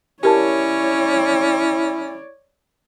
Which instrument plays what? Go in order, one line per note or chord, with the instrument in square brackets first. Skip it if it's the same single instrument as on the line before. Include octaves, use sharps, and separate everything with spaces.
[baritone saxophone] C#4 [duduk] E4 [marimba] G4 A#4 A5 [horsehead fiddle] C#5 D5